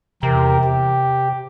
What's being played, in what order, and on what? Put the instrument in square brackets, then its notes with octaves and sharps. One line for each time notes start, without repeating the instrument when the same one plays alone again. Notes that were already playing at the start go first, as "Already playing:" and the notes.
[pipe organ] E2 G4 A#4 [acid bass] C3
[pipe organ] G4